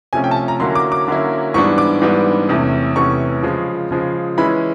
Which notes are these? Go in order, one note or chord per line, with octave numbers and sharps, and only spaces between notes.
C3 F3 A3 C#4 G#5
G5
A5
G#5
A#5
D3 F#3 A#3 C#4 E4 C6
D6
D6
D3 F#3 A#3 C#4 E4
G#2 E3 G3 B3 D4 C#6
D6
G#2 E3 G3 B3 D4
E2 C3 E3 A3 C#4
E2 C3 E3 A3 C#4 C#6
C#3 F3 G#3
C#3 F3 G#3
E3 G#3 C#4 E4 B5